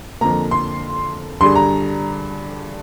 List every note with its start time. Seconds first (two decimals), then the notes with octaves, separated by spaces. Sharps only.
0.21 F2 D3 F3 A#3 A#5
0.51 C6
1.41 G2 D3 G3 D4 G#4 C6
1.56 A#5